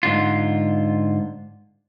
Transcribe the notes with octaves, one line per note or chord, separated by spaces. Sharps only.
G#2 D3 F4